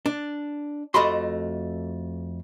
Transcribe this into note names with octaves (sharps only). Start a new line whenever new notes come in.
D4
F2 A3 F#4 D#5 B5 C6